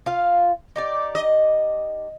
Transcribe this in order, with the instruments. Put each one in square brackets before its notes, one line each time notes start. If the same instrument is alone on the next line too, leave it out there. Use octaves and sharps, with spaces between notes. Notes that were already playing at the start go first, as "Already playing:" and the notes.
[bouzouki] F4 F5
D#4 G4 D5
[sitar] D#5